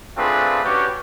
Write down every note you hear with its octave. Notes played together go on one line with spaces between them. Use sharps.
A3 C4 D4 F4 G#4 B4
C#4 D4 F#4 G4 B4 C#5